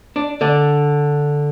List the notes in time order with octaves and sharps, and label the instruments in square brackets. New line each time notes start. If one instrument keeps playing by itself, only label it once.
[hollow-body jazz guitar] D4
D3 D4